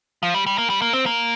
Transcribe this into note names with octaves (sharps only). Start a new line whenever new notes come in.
F3
G3
G3
A#3
G3
A#3
C4
A#3